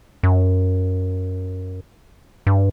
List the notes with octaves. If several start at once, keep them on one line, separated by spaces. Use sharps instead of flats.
F#2
G2